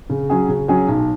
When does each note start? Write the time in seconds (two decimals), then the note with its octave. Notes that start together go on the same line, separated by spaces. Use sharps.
0.10 C#3
0.30 F#3 C#4 G#4
0.48 C#3
0.68 F#3 C#4 G#4
0.88 B1